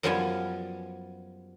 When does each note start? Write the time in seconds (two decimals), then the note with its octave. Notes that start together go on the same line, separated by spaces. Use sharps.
0.03 F#2 F3 G3 B3 F4 G#5